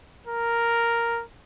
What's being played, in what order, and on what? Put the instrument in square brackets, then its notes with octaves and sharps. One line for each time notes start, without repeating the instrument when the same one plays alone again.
[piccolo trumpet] A#4